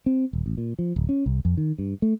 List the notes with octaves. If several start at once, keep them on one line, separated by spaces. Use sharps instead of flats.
C4
D#1
A1
A#2
F3
D1
C#4
C2
F2
D#3
G2
A3